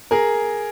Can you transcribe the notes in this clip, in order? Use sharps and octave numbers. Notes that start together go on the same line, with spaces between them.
G#4 A#4